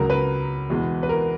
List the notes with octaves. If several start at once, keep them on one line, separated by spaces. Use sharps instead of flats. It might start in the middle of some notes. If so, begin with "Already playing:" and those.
Already playing: C#2 C#3 F#3 A#4
B4
E2 B2 G#3
B4
A#4